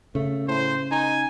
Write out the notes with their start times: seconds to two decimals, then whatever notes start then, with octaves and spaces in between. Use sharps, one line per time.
0.15 C#3 A3
0.48 A2 C5
0.91 D#4 G#5